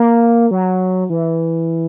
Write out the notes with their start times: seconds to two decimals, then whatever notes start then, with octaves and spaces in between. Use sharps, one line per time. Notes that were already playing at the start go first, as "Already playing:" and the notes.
Already playing: A#3
0.51 F#3
1.10 E3